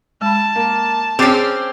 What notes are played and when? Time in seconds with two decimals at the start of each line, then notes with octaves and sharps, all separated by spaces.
0.21 G#3 A5 B5
0.55 A#3
1.19 C4 C#4 G#4 G5 D6 A6 C7